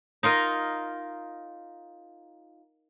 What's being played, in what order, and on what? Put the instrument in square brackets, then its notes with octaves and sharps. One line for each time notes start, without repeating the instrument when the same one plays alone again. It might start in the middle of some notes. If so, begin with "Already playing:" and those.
[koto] D#4 F4 A#4 D#5